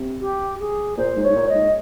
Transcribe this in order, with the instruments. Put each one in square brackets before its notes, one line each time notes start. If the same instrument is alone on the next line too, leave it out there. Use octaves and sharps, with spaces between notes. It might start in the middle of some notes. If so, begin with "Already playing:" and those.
Already playing: [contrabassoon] C3
[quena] G4
G#4
[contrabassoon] A#2 [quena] C5
[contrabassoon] G#2
[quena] C#5
[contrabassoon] G#2
A#2
[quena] D#5
[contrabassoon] G#2